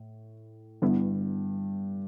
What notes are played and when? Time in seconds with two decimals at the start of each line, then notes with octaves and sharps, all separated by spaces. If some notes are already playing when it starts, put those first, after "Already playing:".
Already playing: A2
0.82 G2 D3 G3 B3 E4